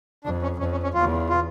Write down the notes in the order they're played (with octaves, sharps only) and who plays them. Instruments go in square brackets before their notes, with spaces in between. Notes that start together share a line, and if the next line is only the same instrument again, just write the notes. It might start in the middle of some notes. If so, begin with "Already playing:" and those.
[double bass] F2 [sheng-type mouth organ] D4
[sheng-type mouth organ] C#4
[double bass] F2 [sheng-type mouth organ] C#4
[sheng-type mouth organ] C#4
C#4
[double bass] E2 [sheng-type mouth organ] F4
[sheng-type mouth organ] F4